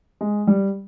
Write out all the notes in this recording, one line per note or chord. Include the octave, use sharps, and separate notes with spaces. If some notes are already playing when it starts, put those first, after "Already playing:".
G#3
G3